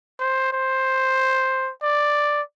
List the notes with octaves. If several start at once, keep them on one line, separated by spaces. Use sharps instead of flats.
C5
C5
D5